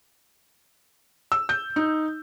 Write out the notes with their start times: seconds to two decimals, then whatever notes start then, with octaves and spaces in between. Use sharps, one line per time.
1.32 E6
1.49 G6
1.76 D#4